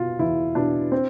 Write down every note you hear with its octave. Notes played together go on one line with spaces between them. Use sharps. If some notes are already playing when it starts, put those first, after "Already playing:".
Already playing: B2 F4
E2 E4
B2 D4
C4